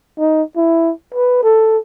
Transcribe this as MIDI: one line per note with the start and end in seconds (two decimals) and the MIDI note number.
0.19 0.43 63
0.56 0.92 64
1.14 1.40 71
1.43 1.78 69